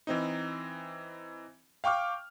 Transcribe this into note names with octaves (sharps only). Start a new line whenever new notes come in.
E3 C4 D#4
F5 G5 C#6 D6 F6